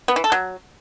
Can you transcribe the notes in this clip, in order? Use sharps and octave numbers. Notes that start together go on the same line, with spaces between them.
B3
E3
A4
F#3